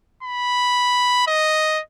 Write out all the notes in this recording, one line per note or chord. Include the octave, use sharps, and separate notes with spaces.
B5
D#5